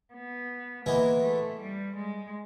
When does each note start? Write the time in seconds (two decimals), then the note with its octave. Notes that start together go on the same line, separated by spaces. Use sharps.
0.14 B3
0.86 E3 G#3 A#3 B3 E4
1.23 A3
1.59 G3
1.96 G#3